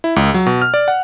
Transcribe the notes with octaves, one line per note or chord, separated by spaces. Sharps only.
E4
C#2
F#3
B2
F6
D5
F#5